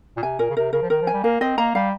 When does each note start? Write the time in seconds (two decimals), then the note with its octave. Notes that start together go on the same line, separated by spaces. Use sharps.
0.17 A#2
0.23 C3 G#5
0.39 A#2 A#4
0.50 C#3
0.56 C3 A#4
0.73 C#3 A#4
0.82 F3
0.90 D#3 A#4
1.02 F3
1.07 G#5
1.13 G3
1.23 A#3 A#4
1.41 C4 D#5
1.58 A#3 A#5
1.75 G3 F5